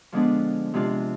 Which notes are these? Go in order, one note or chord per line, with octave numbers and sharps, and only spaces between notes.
D3 F3 G#3 B3 D4
C3 G#3 D4 F4